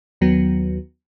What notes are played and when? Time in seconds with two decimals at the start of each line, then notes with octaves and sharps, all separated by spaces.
0.21 D#2 D#3 F#3 B3